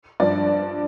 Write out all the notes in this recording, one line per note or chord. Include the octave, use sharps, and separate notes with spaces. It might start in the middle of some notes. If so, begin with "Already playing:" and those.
G2 F3 D5